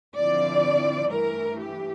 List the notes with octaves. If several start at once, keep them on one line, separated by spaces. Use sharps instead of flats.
D3 F3 C4 E4 D5
G2 E3 A3 A#4
G4